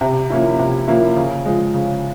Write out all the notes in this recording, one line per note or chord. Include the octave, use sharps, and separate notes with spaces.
C3
F3 A#3 C#4 E4
C3
F3 A#3 C#4 E4
C#3
F3 G#3
C#3